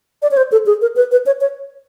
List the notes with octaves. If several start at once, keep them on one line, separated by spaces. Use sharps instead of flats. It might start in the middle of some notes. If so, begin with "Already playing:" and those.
D5
C#5
C5
A4
G#4
A#4
B4
B4
C#5
C#5